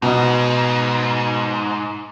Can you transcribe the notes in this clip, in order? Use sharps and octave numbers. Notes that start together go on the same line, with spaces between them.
G#2 B2